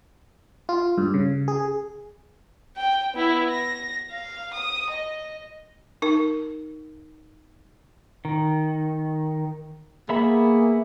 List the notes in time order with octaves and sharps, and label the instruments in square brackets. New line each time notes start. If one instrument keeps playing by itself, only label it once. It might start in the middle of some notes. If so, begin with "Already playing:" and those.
[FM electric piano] F4
G2
C#3
G#4
[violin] G5
B3 E4
A#6
F5
D#6
D#5
[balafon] D#4 A#4
[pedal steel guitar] D#3
[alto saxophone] A#3 [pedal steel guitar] B3 E5 B5 [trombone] G#4